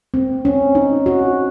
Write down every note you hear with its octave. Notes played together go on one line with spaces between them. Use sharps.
C4
C#4
D#4
F#4